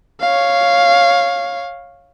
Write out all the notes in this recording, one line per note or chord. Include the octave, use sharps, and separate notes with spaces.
C#5 F5